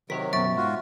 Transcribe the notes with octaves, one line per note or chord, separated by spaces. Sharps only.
C3 D#3 F#3 A#4 B4 C#5 B6
F#2 B2 E5 C#6 A6 D7
G#2 F4 F#4